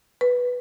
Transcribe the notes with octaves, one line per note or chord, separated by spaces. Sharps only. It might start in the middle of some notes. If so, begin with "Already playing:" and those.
B4